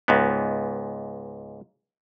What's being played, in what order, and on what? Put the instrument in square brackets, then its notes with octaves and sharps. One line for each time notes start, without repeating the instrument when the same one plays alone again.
[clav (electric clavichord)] C#2 G#2 B3